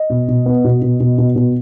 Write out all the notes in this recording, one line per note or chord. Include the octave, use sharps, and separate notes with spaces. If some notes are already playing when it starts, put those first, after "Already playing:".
Already playing: D#5
B2
B2
B3
B2
B2
B2
B2
B2